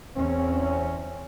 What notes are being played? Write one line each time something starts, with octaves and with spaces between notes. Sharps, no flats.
E2 C4 C#4